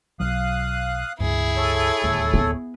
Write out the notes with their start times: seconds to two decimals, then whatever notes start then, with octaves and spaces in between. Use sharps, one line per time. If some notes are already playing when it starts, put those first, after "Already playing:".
0.20 B1 F#3 F5 D#6 F#6
1.20 C#2 G2 E4 G#4
1.57 A4 C#5
2.04 D1 D#2 G#3
2.34 B3